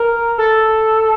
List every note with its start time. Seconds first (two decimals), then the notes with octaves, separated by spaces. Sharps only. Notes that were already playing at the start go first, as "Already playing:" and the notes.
Already playing: A#4
0.38 A4